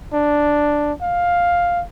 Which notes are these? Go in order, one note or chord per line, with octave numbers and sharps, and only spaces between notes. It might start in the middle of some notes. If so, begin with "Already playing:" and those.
D4
F5